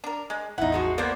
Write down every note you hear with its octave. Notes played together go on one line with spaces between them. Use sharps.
D4 A#4
G#3
A1 E2 D#4 E4 F#5
F3 G#3 F#4
A#3 B3 C5 D5